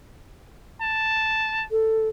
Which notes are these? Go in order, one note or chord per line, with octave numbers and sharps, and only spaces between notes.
A5
A4